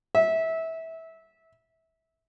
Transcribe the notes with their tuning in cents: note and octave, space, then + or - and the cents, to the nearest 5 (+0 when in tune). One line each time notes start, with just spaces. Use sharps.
E5 -20